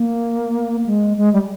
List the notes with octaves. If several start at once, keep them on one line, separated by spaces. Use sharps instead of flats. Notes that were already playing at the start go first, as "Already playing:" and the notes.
Already playing: A#3
G#3
G#3
G3